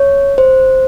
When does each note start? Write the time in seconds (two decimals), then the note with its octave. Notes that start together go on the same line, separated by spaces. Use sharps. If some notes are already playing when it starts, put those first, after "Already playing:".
Already playing: C#5
0.38 C5